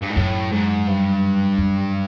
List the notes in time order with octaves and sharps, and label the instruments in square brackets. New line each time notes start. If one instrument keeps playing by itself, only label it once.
[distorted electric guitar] G2
G#2
[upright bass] F#2 [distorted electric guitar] A2
[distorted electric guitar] G#2
G2
[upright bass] F#2